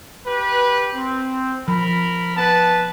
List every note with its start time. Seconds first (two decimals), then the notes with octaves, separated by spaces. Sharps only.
0.26 G4 B4
0.94 C4
1.68 F3 A#4 B5
2.37 B3 B4 A5